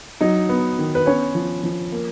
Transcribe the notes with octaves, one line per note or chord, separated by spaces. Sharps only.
F#3 D#4 D#5
B3
D#3
B4
B3 C#4 C#5
F3
F3
A#3